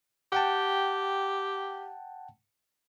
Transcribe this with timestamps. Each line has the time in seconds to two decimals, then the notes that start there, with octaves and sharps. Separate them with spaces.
0.33 G4 F#5 G5 A5